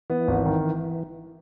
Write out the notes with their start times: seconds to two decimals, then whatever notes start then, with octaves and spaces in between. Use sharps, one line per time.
0.10 E3 B3
0.28 G#1
0.45 D#3